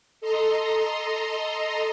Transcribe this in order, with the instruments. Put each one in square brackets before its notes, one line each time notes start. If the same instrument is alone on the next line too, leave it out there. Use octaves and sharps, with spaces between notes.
[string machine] A4 D#5 A#5 C6